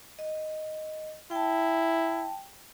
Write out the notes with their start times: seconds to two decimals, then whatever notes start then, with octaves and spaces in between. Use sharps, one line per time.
0.19 D#5
1.31 E4 G5 A5